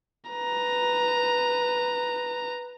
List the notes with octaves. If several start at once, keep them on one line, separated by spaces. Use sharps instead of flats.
B4 A#5